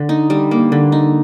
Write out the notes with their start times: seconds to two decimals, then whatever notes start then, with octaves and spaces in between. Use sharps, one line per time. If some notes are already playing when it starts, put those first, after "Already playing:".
Already playing: D3
0.09 D#4
0.30 G3
0.51 A#3
0.72 D3
0.92 D#4